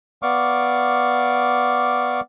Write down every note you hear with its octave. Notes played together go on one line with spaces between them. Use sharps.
B3 D5 F5 C#6 D6